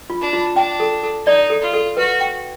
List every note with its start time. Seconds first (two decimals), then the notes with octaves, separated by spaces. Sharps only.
0.10 F4
0.21 D4
0.33 F4
0.56 D4 G5
0.80 A4
1.03 A4
1.26 D#4 D5
1.50 A4
1.62 F4
1.73 A4
1.97 F#4 B4
2.20 G5